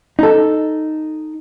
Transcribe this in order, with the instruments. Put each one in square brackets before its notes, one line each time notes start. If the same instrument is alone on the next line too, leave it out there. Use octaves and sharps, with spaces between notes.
[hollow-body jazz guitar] D#4 A4